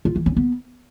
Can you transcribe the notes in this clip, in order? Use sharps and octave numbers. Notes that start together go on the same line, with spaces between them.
F4
E3
C#4
B3